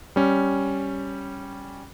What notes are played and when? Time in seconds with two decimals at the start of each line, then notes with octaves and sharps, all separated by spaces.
0.16 G3 C#4